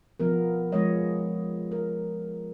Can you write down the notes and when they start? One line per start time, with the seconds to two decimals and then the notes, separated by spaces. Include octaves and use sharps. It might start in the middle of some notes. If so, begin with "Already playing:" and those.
0.20 F3 B3 A#4
0.72 F3 G#3 C#5 D#5
1.71 A#4